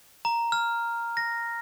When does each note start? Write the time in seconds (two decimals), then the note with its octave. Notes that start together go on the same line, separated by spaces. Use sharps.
0.25 A#5
0.52 F6
1.17 A#6